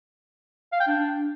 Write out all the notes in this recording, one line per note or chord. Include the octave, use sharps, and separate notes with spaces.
F5
G5
D4